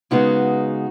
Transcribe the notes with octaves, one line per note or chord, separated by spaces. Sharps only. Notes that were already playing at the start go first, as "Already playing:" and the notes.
C#3 G#3 B3 D#4 F#4